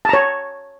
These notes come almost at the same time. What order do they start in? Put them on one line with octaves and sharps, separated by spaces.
A5 A#5 C#5